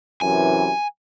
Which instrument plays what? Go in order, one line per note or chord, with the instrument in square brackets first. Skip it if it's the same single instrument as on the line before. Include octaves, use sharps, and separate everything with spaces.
[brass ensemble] F#2 C3 E3 [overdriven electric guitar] G#5